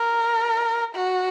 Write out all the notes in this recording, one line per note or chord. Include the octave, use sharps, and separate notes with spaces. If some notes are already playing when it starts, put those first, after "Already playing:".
Already playing: A#4
F#4